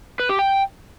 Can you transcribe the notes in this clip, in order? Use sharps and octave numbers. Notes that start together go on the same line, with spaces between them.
B4
G4
G5